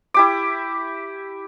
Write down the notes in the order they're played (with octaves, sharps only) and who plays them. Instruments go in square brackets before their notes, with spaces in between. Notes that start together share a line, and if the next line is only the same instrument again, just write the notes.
[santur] E4 G4 D6